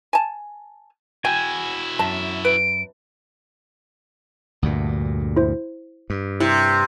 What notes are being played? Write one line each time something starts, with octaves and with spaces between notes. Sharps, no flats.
G#5 A5
E4 F#4 G5 G#5
F#2 A5
B4 D7
D2 G2 A#2
E4 C5
G2
C3 E4